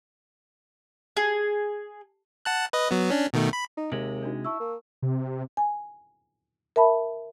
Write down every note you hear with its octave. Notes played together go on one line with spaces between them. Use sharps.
G#4
F#5 A5 F#6
B4 D#5
F#3 B3
C#4 D4
B2 D#3 A3
B5
D#4
D#2 C3 G#3 F#7
D4 D#4 F#4
E4 A5 C#6 E6
A#3
C3
G#5
A#4 E5 A5 B5